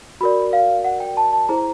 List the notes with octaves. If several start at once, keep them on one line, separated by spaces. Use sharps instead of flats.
F#4 A#4 D5 B5
F5
F#5
G5
A5
A5
E4 G#4 C5 A#5